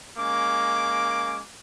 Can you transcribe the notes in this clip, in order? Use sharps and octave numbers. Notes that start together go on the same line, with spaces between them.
G#3 A#3 C#4 D6